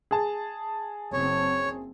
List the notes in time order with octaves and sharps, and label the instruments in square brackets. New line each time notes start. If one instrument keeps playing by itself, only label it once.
[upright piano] G#4 A5
[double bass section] F#1 C4 [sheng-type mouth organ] C#5